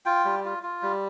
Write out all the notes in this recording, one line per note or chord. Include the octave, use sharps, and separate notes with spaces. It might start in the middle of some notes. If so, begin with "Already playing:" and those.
F4 G5
G3
F4
F4
G3